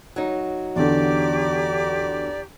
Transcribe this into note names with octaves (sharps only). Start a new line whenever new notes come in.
F#3 D#4
E2 D3 G4 D5 A#5 D6